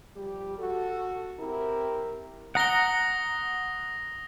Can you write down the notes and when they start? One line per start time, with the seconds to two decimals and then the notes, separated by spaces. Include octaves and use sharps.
0.16 F3 G3 G4
0.58 F#4 A4
1.39 C4 E4 G4 A#4
2.55 F#5 A#5 D#6 A#6 G7